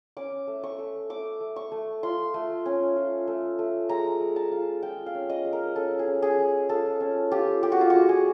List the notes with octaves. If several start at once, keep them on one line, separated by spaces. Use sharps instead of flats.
C#4 D6
A3
C#6
A3
A3 D6
A3
C#6
A3
F4 C6
A3
C#4
F4
A3
A3
G#3 A#5
G#3
A5
F4
G#3 G5
F5
C#4
D#5
G#3
A#4
C#4 A4
G#4
C#4
G#4
G#3
F4 A4
C#4
F4 G4
G#3 G4
F#4
F4
G#3 F#4
G#4